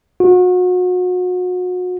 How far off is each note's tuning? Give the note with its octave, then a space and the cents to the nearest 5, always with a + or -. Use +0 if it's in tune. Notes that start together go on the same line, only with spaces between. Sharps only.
F#4 -35